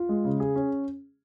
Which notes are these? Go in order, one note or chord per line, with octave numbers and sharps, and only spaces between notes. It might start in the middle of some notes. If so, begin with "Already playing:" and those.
Already playing: F4
G#3
C#3
G#4
C#4